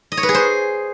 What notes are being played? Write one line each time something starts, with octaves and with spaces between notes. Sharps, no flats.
D#5
C#5
B4
G#4
C5